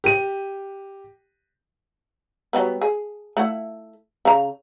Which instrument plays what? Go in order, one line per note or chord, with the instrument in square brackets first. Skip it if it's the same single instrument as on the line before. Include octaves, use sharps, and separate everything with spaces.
[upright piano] G4 D#7
[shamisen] F#3 G3 B3
G#4
A3 E4 F#5
C#3 A#5